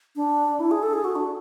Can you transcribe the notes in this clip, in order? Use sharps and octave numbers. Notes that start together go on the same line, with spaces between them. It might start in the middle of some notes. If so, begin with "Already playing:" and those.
D4
E4
G#4
A4
G#4
F#4
D4